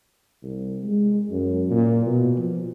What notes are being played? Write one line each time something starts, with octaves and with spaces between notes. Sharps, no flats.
C2
G#3
F#2
A#2
B2
F3